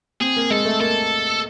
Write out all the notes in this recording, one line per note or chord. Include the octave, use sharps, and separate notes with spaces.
C4 G#4
A#3
G#3 A4
A3
A#3 A4